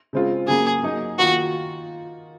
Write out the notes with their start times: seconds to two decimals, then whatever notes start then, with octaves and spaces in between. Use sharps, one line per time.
0.13 C#3 G#3 C4 F4
0.47 C#3 F#3 A#3 G#4
0.83 F#3 A#3 D#4
1.19 D#3 A#3 F4 F#4 A#4